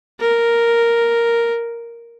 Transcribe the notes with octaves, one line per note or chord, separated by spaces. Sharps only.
A#4